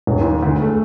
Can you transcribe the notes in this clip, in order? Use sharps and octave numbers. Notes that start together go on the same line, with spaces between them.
D#1
D#2
D2
A3